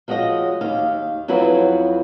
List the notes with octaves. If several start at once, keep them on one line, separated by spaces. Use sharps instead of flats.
F3 G#3 F#4 C#5 D#5
D#2 F5
F2 F#3 E4 F#4 B4